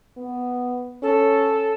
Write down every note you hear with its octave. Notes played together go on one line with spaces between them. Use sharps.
B3
C#4 A4